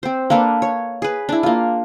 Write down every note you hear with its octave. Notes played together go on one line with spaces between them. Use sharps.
C4 C5
A#3 D4 A4 B4
C#5
G#4 B4
D4 E4
A#3 F4